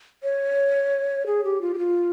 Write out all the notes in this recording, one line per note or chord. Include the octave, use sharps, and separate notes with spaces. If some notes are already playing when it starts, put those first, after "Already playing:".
C#5
G#4
G4
F4
G4
F4